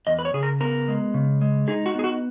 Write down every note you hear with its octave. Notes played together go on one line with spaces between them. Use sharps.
E2 D#5
B4
C#5
C#3 G#4
A#4
B3 A#4
G#3
C#3
G#3
D#4 G#4
F#4
B3 G#4
F#4